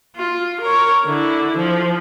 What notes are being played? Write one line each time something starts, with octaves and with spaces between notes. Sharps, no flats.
F4
A#4 C#5
D3 E4
F3